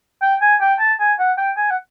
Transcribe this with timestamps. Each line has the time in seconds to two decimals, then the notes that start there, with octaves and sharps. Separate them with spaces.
0.22 G5
0.42 G#5
0.61 G5
0.80 A5
1.00 G#5
1.19 F#5
1.38 G5
1.57 G#5
1.70 F#5